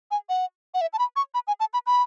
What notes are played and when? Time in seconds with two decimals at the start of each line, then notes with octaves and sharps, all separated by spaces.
0.11 G#5
0.29 F#5
0.74 F#5
0.81 E5
0.93 A5
0.99 B5
1.16 C#6
1.34 B5
1.47 G#5
1.60 A5
1.73 B5
1.86 B5